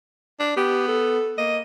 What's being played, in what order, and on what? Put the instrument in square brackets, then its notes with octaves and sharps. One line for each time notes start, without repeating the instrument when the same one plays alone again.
[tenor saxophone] D4
[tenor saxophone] B3 [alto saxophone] G4
[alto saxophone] A4
[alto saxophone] A#3 [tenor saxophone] D#5